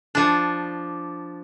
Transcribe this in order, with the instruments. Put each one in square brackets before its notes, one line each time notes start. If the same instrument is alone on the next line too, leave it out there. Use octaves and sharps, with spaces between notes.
[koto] F3 D4